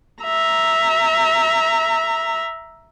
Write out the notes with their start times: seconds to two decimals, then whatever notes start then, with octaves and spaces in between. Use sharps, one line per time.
0.23 E5 A#5